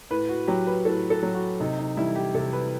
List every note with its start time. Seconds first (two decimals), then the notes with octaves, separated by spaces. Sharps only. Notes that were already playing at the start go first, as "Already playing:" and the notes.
0.10 A2 B4
0.29 F#4
0.48 F#3 G4
0.67 B4
0.85 A2 A4
1.10 A4
1.23 F#3
1.35 F#4
1.60 C3 D#4
1.79 D#4
1.97 E3 G3 E4
2.16 G4
2.34 C3 A4
2.53 B4